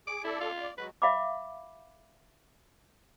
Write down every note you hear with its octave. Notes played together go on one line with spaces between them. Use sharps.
G#4 D6
E4 A4 D5
F4
D5
F#3 G#3 F#4 B4
E5 F5 B5 D6